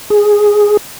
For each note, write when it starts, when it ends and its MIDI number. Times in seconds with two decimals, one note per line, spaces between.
0.10 0.77 68